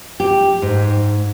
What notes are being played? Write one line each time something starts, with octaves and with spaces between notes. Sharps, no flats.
G4
G#2